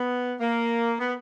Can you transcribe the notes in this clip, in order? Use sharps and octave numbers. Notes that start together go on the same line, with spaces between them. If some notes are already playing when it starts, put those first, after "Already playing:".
Already playing: B3
A#3
B3